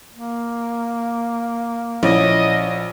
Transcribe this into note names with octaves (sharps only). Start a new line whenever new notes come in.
A#3
A#1 C#4 E4 D#5